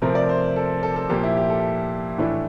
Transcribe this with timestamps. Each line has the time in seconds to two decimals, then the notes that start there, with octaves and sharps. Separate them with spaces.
0.02 C3 F3 A3 C4 A#4
0.15 D5
0.29 C5
0.56 A4
0.83 A4
0.96 A4
1.09 A#2 F3 A#3 G4
1.23 E4
1.37 G4
1.50 A4
2.18 A2 E3 A3 D4